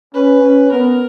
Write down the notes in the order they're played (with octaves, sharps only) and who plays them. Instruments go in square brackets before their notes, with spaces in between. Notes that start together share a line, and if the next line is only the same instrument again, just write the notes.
[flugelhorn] C#4 [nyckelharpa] B4
[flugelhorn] C#4
[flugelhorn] B3 [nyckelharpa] A#4